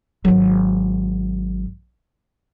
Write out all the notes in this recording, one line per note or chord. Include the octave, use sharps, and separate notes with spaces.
G#1 F#3